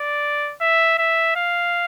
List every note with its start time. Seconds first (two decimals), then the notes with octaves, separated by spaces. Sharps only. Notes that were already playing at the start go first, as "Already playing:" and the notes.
Already playing: D5
0.61 E5
0.98 E5
1.36 F5